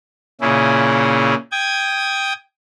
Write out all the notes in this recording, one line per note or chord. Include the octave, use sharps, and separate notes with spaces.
A#2 C#3 C#4 E4 G#4
G5 D#6 G#6